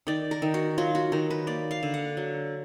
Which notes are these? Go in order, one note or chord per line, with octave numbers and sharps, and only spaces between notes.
D#3 D5
A#4
D#3
F#4
F#3 F4
F#4
D#3 A#4
B4
A#3 D5
F5
D3
F#5
F#3